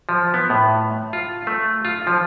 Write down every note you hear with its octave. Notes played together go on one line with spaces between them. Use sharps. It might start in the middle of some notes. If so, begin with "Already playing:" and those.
F3
B3
A2
F4
A3
F4
F3